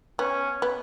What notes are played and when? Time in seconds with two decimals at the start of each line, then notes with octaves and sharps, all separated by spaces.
0.19 B3 C#4
0.62 B3